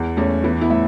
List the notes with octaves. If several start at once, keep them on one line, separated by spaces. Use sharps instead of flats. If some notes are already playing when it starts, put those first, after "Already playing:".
Already playing: E2
E2 A3 C#4
E3 B3 E4
B3 E4
A2 E5